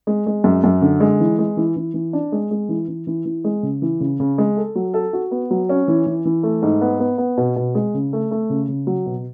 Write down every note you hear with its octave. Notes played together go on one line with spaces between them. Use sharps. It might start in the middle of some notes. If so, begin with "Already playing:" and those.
G#3
G#3
F#2
F#2
D3
G#3
E3
G#3
E3
E3
E3
D4
G#3
G#3
E3
E3
E3
E3
G#3
C#3
E3
C#3
C#3
G#3
A4
F#3
A4
F#4
B3
F#3
C#4
E3
E3
E3
A3
G#2
B3
B3
B3
B2
B2
G#3
C#3
A3
A3
C#3
C#3
F#3
B2